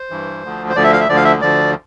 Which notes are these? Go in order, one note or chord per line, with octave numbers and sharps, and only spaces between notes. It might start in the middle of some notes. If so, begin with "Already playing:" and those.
Already playing: C5
G2 E3
D2 D3 F3
C5
D2 D3 F3 D5
E5
F5
E5
D2 D3 F3 D5
F5
E5
D2 D3 F3 D5